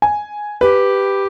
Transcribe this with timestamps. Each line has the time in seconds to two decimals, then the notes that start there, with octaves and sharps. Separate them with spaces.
0.02 G#5
0.61 G4 B4